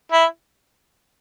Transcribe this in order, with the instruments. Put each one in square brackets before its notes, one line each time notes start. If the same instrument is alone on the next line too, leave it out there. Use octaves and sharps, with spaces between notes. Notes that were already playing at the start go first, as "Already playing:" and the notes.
[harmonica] E4